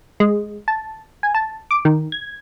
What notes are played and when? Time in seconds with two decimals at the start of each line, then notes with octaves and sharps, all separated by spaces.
0.20 G#3
0.68 A5
1.23 G#5
1.35 A5
1.71 D6
1.85 D#3
2.12 G#6